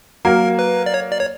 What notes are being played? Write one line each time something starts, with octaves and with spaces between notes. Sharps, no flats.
F#3 A#3 A#4
B4
D5
C#5
D5
C#5